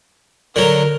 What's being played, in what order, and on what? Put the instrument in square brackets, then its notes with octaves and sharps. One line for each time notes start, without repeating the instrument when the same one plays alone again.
[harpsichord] D3 F#3 [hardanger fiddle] A#4